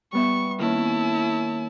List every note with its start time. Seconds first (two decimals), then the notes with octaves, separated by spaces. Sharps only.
0.13 G3 B3 E5 C#6
0.59 D#3 A#3 C#4 E4 A5
1.14 C#6